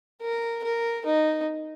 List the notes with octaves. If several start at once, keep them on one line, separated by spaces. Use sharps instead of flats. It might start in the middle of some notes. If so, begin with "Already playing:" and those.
A#4
A#4
D#4